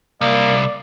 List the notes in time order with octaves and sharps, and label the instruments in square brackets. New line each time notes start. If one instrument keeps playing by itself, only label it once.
[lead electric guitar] C2 [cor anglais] A#3 [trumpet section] D5